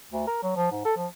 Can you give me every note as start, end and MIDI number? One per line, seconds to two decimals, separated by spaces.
0.12 0.26 38
0.27 0.41 70
0.43 0.55 54
0.56 0.69 53
0.71 0.83 44
0.85 0.93 69
0.97 1.07 53